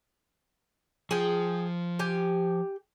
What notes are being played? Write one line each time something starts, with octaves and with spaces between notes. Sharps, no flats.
F3 G#4 G5
G4 G#5